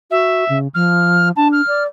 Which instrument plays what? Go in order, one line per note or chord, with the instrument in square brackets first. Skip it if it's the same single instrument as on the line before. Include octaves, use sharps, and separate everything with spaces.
[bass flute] F#4 [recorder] E5
[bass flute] C#3
[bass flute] F3 [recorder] F6
[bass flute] D4 [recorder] A5
[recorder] F6
[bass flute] D5